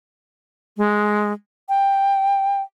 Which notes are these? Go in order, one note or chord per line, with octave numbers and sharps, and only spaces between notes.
G#3
G5